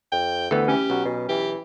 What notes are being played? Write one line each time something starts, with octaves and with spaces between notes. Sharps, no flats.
F2 G5
D2 E3 B3 A4
C#4 G4
B1 F#4
B2
E3 G4